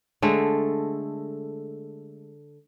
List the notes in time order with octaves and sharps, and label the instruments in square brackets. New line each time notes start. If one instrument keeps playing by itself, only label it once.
[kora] D3 G#3 A3